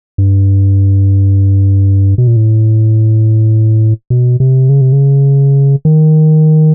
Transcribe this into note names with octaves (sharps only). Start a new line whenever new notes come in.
G2
B2
A#2
A2
B2
C3
C#3
C3
C#3
D#3